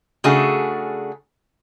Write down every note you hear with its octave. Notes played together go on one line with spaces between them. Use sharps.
C#3 A3 D4 F#4 G#4